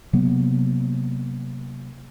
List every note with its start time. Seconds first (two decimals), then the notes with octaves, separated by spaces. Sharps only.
0.13 C3 F#3 A#3 B3